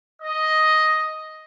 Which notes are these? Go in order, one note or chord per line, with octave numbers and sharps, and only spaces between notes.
D#5